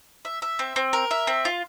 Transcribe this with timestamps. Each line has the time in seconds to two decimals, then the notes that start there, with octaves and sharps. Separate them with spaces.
0.25 E5
0.42 E5
0.59 C4
0.76 C4
0.93 A#4
1.11 E5
1.27 C4
1.45 F4